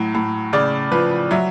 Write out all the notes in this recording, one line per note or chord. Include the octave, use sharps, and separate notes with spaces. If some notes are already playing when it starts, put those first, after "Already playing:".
Already playing: A2 F#3
A2
C#3 D5
F3 B4
F#3 E5